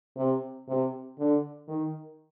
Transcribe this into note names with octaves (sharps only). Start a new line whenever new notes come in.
C3
C3
D3
D#3